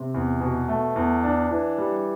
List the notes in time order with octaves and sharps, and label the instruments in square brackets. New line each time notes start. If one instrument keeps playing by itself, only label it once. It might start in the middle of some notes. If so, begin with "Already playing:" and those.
Already playing: [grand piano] C3 C4
E2
B2
A3
E2
D4
E3
G3